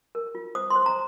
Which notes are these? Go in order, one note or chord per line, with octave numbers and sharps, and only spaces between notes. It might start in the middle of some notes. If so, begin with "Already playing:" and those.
A#4
F4
C5 D#6
C6
C5
A#5